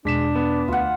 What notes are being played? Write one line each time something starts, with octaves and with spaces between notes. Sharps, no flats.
E2 B2 G#3 D4 B6 E7
B3
D2 F4 F#5